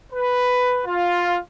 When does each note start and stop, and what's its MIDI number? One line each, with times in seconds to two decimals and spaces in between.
0.13 0.79 71
0.85 1.37 65